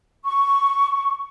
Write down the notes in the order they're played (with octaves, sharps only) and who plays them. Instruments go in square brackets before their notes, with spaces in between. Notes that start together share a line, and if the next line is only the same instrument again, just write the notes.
[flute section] C#6